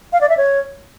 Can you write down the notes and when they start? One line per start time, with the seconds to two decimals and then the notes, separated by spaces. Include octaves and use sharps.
0.13 F5
0.21 D5
0.29 E5
0.37 C#5